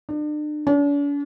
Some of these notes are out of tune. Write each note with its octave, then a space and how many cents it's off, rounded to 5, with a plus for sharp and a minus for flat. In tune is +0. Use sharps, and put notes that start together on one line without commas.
D4 +40
D4 -45